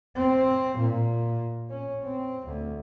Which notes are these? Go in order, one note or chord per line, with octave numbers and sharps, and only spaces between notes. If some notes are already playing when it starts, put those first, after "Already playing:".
C4
A#2
C#4
C4
D2